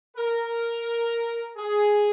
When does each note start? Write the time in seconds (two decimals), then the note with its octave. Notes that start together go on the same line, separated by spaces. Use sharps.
0.17 A#4
1.57 G#4